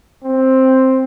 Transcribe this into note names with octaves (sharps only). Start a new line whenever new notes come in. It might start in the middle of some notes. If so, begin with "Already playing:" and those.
C4